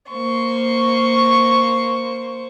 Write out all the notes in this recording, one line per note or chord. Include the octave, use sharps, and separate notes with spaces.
A#3 C5 C#6